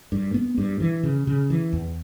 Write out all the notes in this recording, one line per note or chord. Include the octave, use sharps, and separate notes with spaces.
G2
B3
G2
E3
C#3
C#3
E3
E2